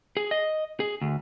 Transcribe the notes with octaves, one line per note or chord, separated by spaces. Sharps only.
G#4
D#5
G#4
D2